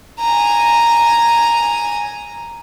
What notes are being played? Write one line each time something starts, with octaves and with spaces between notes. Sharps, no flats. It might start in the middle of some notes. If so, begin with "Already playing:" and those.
G#5 A#5